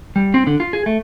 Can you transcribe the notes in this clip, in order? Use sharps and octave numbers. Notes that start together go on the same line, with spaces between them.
G3
C4
D3
F4
G#4
A3